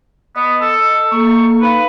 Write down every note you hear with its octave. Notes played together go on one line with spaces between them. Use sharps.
B3 D#5
A4
A#3 A4 C#6
D#4 B4 F5 B5